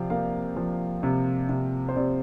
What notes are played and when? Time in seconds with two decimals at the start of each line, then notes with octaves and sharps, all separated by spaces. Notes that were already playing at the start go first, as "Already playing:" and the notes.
Already playing: C3 F3 G4 D5 F5
0.10 A#3 F5
0.56 F3
1.03 C3
1.49 C3
1.89 C5
1.96 C3 D5